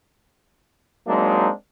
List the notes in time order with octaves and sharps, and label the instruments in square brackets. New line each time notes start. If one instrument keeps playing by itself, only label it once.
[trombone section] F#3 G#3 A#3 C4 D4 D#4